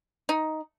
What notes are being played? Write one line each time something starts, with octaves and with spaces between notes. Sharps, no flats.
D#4